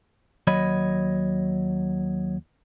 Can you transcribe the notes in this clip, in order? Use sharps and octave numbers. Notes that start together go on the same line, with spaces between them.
D#2 F#3 C#5 D#5 B5